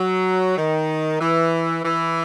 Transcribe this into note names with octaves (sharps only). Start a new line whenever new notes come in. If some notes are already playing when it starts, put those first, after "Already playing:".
Already playing: F#3
D#3
E3
E3